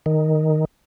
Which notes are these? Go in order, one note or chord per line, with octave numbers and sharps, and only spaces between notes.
D#3